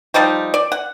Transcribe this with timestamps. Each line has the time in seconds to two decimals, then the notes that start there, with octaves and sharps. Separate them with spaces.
0.14 F3 G3 D#4 G4
0.54 D5
0.72 F#5